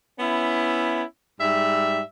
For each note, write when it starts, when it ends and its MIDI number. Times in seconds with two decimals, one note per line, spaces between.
0.20 1.04 59
0.20 1.04 61
0.20 1.04 64
1.41 2.02 44
1.41 2.02 55
1.41 2.02 76